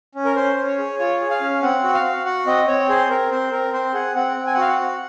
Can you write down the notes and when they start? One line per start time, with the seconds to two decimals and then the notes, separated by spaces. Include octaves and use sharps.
0.15 C#4
0.25 A#4
0.36 C#4 C5
0.57 C#4
0.67 C#5
0.78 G#4
0.99 F4 C#5
1.20 G#4
1.31 F5
1.41 C#4
1.62 C4 F#5
1.84 F#4
1.94 F5
2.05 F#4
2.25 F#4 F#5
2.46 C4 D#5
2.68 C4 C#5
2.89 G#4 C5
3.10 C4 A#4
3.31 C4 C5
3.52 C4 A#4
3.73 C4 C5
3.94 G#4 F#5
4.15 C4 F#5
4.37 C4
4.47 G#5
4.54 F#5
4.57 F#4 F5
4.68 F#5
4.78 F#4